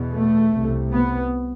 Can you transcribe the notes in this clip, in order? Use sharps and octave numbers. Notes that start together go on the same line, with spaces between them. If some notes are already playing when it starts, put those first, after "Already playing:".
Already playing: E2 B2
A3
C2 C3
B3